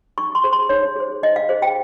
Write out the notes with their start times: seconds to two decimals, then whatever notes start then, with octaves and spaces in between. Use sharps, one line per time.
0.18 D#4 C#6
0.35 C6
0.44 G#4 C5
0.53 C6
0.69 D#4 C#5
0.96 G#4 C5
1.23 D#4 D#5
1.36 F5
1.49 G#4 C5
1.62 G5